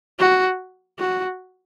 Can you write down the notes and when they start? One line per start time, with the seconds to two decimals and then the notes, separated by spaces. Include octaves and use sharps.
0.19 F#4
0.99 F#4